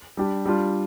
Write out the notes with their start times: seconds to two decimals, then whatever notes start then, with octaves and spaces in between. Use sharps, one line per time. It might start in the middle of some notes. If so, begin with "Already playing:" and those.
0.17 G3 D4 G4
0.46 G3 D4 F4